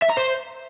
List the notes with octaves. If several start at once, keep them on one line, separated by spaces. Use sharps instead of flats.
E5
A#5
C5